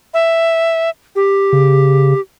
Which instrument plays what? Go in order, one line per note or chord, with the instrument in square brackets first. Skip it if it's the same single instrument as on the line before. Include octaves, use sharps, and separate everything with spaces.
[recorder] E5
G4
[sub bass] C#3